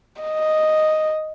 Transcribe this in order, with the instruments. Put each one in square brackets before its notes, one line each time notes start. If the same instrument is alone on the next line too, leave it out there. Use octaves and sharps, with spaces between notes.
[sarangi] D#5